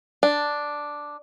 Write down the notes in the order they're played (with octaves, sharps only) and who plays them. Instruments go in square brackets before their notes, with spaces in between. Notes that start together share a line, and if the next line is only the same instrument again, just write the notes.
[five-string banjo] D4